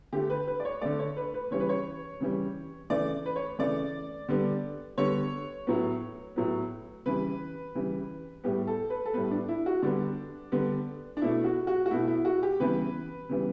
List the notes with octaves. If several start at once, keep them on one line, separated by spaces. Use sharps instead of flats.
D3 A3 G4
B4
B4
D5
C#5
D3 A3 D5
C#5
B4
B4
C#3 E3 G3 C#5
B4
C#5
C#3 E3 G3
C#3 E3 A3 D5
B4
C#5
C#3 E3 A3 D5
D3 G3 B3
D3 G3 B3 C#5
A2 F#3 B3
A2 F#3 B3
C#3 E3 G3 B4
C#3 E3 G3
A2 G3 B3 G4
A4
B4
A4
A2 G3 B3 B4
D4
E4
F#4
D3 G3 B3 D4
D3 G3 B3
D4
B2 A3 E4
F#4
F#4
F#4
B2 A3 E4
E4
F#4
G4
C#3 E3 G3 B3 B4
C#3 E3 G3 B3